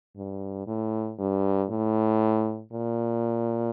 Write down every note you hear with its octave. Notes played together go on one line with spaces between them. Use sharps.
G2
A2
G2
A2
A#2